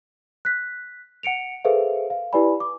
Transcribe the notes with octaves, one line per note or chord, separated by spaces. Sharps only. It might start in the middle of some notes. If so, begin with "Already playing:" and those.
F#6 B6
F#5 C#7 D7 F7
G#4 A4 B4 C5 E5 F5
F5
E4 G4 B4 D5 G#5 B5
D6